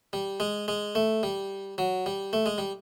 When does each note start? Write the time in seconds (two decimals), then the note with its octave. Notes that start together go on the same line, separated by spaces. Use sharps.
0.13 G3
0.40 G#3
0.68 G#3
0.95 A3
1.23 G3
1.78 F#3
2.06 G3
2.33 A3
2.46 G#3
2.58 G3